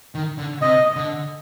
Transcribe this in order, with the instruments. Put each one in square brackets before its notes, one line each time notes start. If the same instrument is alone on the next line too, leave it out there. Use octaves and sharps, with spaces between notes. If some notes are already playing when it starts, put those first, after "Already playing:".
[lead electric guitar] D#3
D3
[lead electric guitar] C3 [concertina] D#5
[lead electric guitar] D3